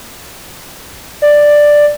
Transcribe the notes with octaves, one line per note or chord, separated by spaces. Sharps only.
D5